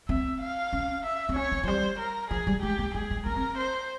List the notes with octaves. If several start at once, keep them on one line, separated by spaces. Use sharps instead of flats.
C4 E5
F5
C#4
E5
C4
C#4 C#5
C4
F3
G3 C5
A#4
F3 G#4
G3
G#3 G4
A#3
G#3 G#4
G#3
A#3 A#4
C4
C5